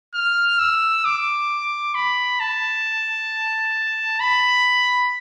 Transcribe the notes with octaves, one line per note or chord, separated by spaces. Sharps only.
F6
E6
D6
B5
A5
B5